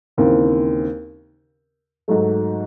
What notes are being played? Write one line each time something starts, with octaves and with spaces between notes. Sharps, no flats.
D#2 C#3 E3 C4
G#2 F#3 A3